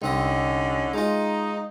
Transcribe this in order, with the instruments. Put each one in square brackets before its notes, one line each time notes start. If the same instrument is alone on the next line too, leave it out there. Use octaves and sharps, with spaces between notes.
[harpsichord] C2 C4 D#5 [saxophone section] D3 C#4 D#4
[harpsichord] G#3 F4 [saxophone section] D#4